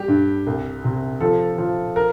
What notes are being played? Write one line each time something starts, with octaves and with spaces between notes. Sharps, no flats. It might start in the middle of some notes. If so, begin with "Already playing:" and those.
Already playing: G3 G4
G2
C2
C3
F3 A4
F3
A#4